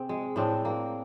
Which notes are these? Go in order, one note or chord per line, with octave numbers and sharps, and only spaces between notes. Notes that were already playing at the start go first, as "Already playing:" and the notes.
Already playing: C3 C4 G#4
G#3
A2 C4 D4
A#3